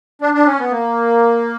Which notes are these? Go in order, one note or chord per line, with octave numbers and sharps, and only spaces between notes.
D4
D4
C#4
B3
A#3